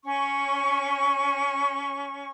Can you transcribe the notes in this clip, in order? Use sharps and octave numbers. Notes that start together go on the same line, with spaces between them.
C#4 C#6